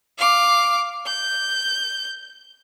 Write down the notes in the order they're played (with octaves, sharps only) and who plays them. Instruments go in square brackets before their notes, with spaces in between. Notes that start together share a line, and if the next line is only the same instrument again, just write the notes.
[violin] F5 D6
G6